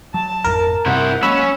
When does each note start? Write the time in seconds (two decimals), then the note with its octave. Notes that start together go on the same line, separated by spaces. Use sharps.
0.14 F#3 A5
0.45 G#1 F2 A2 A#4
0.86 G2 C3 C4 E4 C5 F#5
1.23 F#3 G#3 A#3 C#4 B5 E6